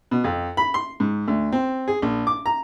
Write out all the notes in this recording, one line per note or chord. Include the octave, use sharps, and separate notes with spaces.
B2
F2
B5
C6
G#2
D2
C4
G#4
A#1
D6
A#5